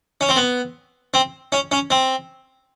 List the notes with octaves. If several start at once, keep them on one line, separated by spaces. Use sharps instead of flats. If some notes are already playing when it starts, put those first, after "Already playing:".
C#4
C4
B3
C4
C#4
C#4
C4